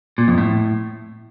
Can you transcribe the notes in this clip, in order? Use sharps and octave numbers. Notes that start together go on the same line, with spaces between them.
A#2
F2
A2